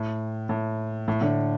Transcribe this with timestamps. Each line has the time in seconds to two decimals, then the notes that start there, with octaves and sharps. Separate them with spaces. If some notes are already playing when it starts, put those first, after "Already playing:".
Already playing: A2
0.49 A2
1.08 A2
1.21 A2 D3